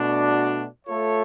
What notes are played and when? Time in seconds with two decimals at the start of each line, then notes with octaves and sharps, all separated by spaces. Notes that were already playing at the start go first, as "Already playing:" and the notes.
Already playing: B2 A3 D4 F#4
0.87 A3 F4 A4 C#5